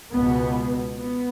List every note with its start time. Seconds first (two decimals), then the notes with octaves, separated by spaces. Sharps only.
0.12 C#2 B2 B3
0.96 B3